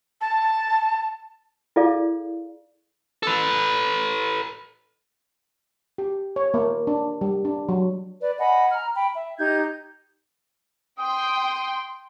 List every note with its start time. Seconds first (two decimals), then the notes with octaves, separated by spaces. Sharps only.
0.21 A5
1.76 E4 G#4 A4 D5 F5
3.23 A4 B4
5.98 G4
6.36 C#5
6.54 A#3
6.87 D4
7.21 G3
7.45 D4
7.69 F#3
8.22 B4 D5
8.38 D#5 F#5 G#5 B5
8.73 A#5 F6
8.94 G5 B5
9.14 E5
9.39 D#4 G4 G6 G#6
11.00 G5 C6 D#6